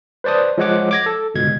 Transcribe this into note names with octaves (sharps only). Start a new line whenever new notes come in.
B4 C5 D5 A5 D#6
F3 G#3 C#5 F#5 D6
D6 G#6 A#6
A4
G1 C#2 B2 G#6